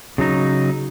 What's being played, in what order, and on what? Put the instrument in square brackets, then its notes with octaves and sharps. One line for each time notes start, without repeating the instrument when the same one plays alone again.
[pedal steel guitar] C#3 F#3 D#4